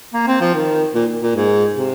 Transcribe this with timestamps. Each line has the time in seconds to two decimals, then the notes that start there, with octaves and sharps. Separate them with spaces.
0.13 A#3
0.27 C4
0.41 F3
0.55 D#3
0.95 A#2
1.23 A#2
1.36 G#2
1.76 C3